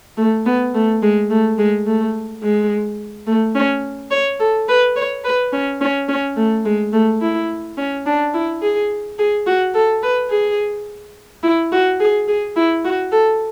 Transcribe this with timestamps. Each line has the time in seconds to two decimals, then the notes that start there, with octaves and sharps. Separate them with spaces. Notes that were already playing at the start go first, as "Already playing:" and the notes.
0.17 A3
0.46 B3
0.74 A3
1.02 G#3
1.30 A3
1.58 G#3
1.87 A3
2.43 G#3
3.27 A3
3.55 C#4
4.11 C#5
4.40 A4
4.68 B4
4.96 C#5
5.24 B4
5.53 C#4
5.81 C#4
6.08 C#4
6.37 A3
6.65 G#3
6.93 A3
7.22 E4
7.77 C#4
8.06 D4
8.34 E4
8.62 G#4
9.19 G#4
9.46 F#4
9.74 A4
10.03 B4
10.30 G#4
11.43 E4
11.72 F#4
12.00 G#4
12.28 G#4
12.56 E4
12.84 F#4
13.12 A4